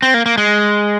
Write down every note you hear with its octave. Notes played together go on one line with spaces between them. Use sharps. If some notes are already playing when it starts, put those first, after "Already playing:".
C4
A#3
A#3
G#3